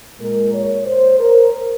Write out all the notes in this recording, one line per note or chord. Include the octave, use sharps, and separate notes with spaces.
A#2 G#3 A#4
C#5
C5
A#4